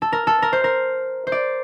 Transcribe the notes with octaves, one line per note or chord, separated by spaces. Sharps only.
A4
A#4
A4
A#4
C5
A#4
C5
D5